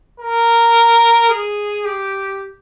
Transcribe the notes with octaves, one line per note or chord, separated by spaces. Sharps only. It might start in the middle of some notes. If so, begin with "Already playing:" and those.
A#4
G#4
G4